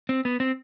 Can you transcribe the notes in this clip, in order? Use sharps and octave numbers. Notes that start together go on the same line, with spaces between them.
C4
B3
C4